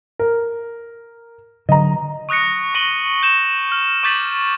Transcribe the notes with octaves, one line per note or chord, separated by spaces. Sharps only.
A#4
D3 F#3 D#5 A#5
C#6 D#6 F#6 A#6 C#7
C#6 A#6 D#7 F#7 G7
G6 E7
F6
C#6 D6 G6 A6 B6 F#7